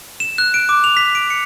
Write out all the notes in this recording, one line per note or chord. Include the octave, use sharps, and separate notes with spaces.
E7
F#6
D7
D6
F7
B6
D7
C#7